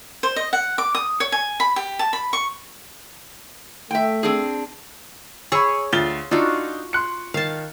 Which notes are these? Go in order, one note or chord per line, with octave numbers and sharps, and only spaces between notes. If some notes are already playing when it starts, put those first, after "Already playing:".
C5
D#5
F#5
D6
D#6
C#5
G#5
B5
G4
A5
B5
C#6
A3 E5 G5
C4 D4 G#4
G#4 C#5 B5 C#6 E6
D2 F4 A6 G7
D4 D#4 F4 F#4 E6
C6 F#6 C#7
D#3 F5 A5